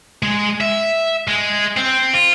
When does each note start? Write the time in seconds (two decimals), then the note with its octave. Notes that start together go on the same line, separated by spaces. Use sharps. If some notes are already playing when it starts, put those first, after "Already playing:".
0.23 G#3
0.61 E5
1.28 G#3
1.76 C4
2.14 F4